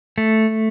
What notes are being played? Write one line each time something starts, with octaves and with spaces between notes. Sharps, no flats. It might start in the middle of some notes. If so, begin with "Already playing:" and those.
A3